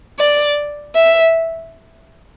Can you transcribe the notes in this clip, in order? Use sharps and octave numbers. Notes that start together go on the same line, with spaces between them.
D5
E5